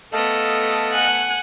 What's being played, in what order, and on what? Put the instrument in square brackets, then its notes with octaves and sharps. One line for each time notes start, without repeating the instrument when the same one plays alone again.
[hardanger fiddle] A3 B3 [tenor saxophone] A4 [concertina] D#5 F5 A5
[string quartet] F#5 G#5 F#6